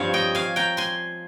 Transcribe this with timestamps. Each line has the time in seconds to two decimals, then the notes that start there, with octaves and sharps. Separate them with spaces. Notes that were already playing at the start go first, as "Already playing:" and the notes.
Already playing: G2 F3 C4 C#5 F5
0.14 D#5 G5
0.35 F5 G#5
0.56 G5 A#5
0.77 G#5 C6